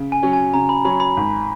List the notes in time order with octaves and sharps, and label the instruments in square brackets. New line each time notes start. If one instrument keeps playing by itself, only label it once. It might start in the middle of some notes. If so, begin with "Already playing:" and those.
Already playing: [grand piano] C#3
[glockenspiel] G#5
[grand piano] F#3 C#4
[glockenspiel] G#5
[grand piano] C#3 [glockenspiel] A#5
[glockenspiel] B5
[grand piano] F#3 C#4 [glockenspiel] B5
[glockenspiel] B5
[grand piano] G#1